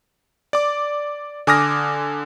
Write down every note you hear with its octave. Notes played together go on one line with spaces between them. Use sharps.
D5 D6
D3 G#5 D6 D#6 F6 A#6